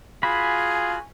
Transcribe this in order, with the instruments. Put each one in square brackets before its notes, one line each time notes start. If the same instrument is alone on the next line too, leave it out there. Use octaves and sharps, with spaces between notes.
[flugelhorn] F4 [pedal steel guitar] F#4 B5 [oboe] G#4 [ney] G#5